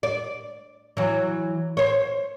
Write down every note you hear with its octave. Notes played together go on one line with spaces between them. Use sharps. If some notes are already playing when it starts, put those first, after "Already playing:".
D5
E3 F#3
C5 C#5